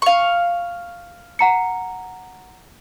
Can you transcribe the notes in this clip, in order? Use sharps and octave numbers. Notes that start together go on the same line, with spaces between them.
F5 C#6
F#5 A#5 C#7